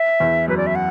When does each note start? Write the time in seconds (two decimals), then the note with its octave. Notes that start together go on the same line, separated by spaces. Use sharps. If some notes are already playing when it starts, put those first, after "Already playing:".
Already playing: E5
0.20 E2
0.48 F#2 B4
0.57 D5
0.67 E5
0.75 F#5